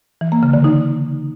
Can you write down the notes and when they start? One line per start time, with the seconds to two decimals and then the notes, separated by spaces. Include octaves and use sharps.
0.21 E3
0.32 A#3
0.43 C#3
0.53 D3
0.64 D#4